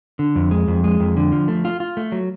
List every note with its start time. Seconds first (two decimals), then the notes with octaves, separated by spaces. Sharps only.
0.19 D3
0.35 F2
0.51 G#3
0.68 F2
0.84 G#3
1.00 F2
1.17 D3
1.32 F3
1.48 A3
1.65 F4
1.80 F4
1.97 A3
2.12 F#3